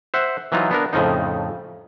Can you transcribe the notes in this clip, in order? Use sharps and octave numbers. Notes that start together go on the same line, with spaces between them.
C5 E5 F#5
E3 F#3 D#4 F4
B3 D4 A#4
F2 A2 C#3 F3 D#4